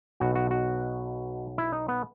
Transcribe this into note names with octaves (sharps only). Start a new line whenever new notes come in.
B1 B2 F#4
F#4
F#4
E4
D#4
B3